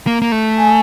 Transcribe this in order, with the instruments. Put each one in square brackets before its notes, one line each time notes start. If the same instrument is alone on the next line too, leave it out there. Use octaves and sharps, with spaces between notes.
[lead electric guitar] A#3
A#3
A3
[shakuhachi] G#5